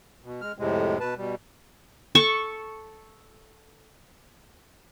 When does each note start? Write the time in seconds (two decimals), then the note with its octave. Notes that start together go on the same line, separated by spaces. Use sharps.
0.24 B2
0.41 G#3 F6
0.59 F2 A2 C3 G#3
1.00 B2 B4 A5
1.17 B2 G3
2.15 A4 C#6